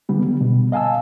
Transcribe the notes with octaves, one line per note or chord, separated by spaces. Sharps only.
D3 D#3 G3 B3
G3
B2
D#5 F5 G#5 A5 E6